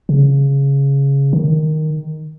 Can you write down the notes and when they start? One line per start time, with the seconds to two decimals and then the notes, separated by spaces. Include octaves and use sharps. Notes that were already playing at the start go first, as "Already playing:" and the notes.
0.09 C#3
1.33 D#3